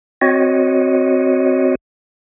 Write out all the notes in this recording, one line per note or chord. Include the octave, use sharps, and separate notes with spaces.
C4 F#4 C#5 D#5